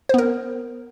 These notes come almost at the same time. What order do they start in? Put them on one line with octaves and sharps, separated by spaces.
C5 B3 A#4